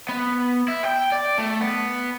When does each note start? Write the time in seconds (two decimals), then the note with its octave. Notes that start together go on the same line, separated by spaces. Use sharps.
0.09 B3
0.68 E4
0.85 G5
1.12 D5
1.38 A3
1.61 B3